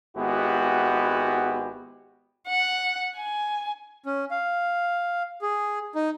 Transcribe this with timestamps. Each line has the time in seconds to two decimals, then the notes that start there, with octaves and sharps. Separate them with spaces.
0.17 G#1 G#3 B3 E4 F#4 G4
2.48 F#5
3.16 G#5
4.06 C#4
4.31 F5
5.42 G#4
5.95 D#4